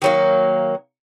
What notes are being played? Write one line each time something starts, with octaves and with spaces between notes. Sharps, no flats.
D#3 F#3 A#3